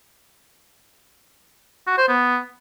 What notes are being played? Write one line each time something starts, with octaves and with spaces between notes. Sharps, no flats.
F#4
C5
B3